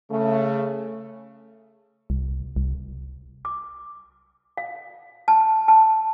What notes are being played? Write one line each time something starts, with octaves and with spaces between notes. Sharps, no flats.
C#3 A3
C2
C2
D6
F5
A5
A5